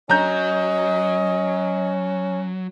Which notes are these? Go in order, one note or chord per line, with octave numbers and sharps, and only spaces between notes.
F#3 C#4 D#5 A#5 G6